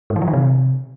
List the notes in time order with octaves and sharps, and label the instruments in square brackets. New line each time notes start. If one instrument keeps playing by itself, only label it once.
[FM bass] G#2
E3
F3
D#3
C3